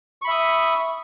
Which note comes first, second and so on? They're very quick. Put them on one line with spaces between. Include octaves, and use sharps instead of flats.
C#6 B5 E5 D#6